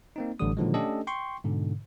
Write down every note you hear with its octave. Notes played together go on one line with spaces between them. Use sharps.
A#3 C4 D#4
A1 A2 D3 E3 G3 D#6
A#2 D3 D#3 F3 F#3 G#3
A3 C#4 D4 G4 A4 D#5
G5 C6 C#6
G#2 B2 D3